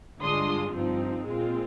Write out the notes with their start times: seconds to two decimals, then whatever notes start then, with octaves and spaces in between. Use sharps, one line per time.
0.20 G2 D3 G#3 D4 F4 C6 D#6
0.73 G2 F3 C4 D#4
1.26 A#2 G#3 C4 F4